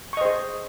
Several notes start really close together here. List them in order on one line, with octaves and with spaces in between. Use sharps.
C#6 D#5 C5 G#4